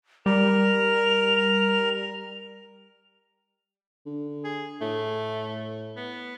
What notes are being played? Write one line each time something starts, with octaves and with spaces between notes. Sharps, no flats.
G3 A#4 F7
D3
G#4
A2 A3
B3